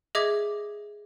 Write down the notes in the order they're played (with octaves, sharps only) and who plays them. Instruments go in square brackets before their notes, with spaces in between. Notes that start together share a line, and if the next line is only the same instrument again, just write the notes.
[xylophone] G#4 D#5 E5 D6 G#6